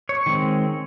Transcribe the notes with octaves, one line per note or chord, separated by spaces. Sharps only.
C#5
D#3 G#3 C4